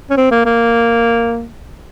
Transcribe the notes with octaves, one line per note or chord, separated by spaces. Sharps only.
C#4
C4
A#3
A#3